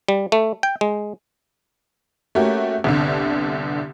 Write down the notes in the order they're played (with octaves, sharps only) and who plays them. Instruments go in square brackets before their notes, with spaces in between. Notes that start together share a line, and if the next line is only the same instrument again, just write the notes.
[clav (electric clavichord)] G3
A3
G5
G#3
[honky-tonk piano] A3 A#3 C#4 F#4 G4
G1 C2 D3